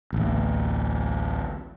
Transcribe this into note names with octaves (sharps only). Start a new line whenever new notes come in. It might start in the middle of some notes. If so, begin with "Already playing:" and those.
A1 D2